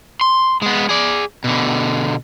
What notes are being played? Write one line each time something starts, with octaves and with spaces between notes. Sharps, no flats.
C6
G#3 B3
G#4 D5
B2 D3